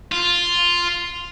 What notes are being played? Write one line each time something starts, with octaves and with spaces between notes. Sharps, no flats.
F4